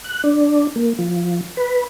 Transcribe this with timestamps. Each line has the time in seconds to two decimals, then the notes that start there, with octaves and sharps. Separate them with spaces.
0.04 F#6
0.24 D4
0.76 A#3
0.98 F3
1.57 B4